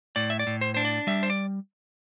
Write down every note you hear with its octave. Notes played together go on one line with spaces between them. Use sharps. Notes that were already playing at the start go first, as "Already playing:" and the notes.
A2 D5
E5
D5
A2
C5
D4 C5
D5
G3 E5
C5
D5